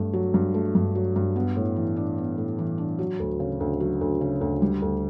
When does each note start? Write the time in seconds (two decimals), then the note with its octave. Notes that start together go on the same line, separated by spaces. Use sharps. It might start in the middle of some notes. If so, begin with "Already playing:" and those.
Already playing: G2 A3
0.13 F#3
0.34 G2
0.54 A3
0.75 G2
0.95 F#3
1.16 G2
1.36 B3
1.56 A2
1.76 E3
1.96 D4
2.18 B3
2.38 A2
2.59 E3
2.78 D4
2.99 F#3
3.20 D2
3.40 C#3
3.60 D2
3.80 F#3
4.01 D2
4.21 C#3
4.41 D2
4.62 G3
4.82 D2